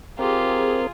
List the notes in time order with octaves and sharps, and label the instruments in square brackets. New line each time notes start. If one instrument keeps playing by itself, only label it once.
[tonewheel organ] C4 A#4 [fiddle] F4 [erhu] G4 [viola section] G#4